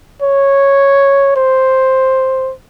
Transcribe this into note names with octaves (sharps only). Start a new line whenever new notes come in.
C#5
C5